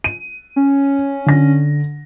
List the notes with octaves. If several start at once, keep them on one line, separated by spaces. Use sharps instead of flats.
D#7
C#4
D3 A#6